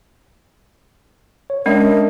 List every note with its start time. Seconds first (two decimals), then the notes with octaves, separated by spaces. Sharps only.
1.50 C#5
1.66 G#3 C#4 D4 A#4 D#5 E5